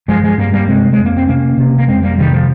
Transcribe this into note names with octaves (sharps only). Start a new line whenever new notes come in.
G2 F3 G#3
F3 G#3
G2 G3 A#3
G3 A#3
C3 G#3 C4
G#3
F2
A#3
C4
C3 A#3 C#4
C3
A#3
F2 G#3 C4
G3 A#3
C3 D#3 G3
F3